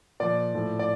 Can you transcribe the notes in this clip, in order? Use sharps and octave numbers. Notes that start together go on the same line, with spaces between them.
A#2 F3 D5
A2 F3
D5